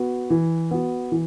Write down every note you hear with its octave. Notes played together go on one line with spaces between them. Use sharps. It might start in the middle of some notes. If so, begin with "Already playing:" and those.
Already playing: B3 F#4
E3
B3 F#4
E3